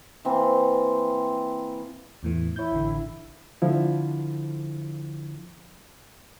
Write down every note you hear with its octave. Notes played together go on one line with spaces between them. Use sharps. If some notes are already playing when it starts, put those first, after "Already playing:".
E3 A#3 C4
E2 A2 E3
E4 C#5 G6
A1 D3
D3 F3 E4